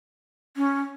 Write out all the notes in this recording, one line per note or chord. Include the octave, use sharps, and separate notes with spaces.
C#4